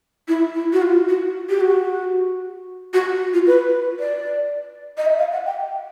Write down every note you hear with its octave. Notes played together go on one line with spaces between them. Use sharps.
E4
E4
F#4
F4
F#4
G4
F#4
F#4
F4
B4
D5
D#5
E5
F5
F#5
G5